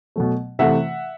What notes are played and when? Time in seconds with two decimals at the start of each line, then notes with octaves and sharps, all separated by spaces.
0.16 B2 F#3 A3
0.59 C3 E3 A3 E5 F#5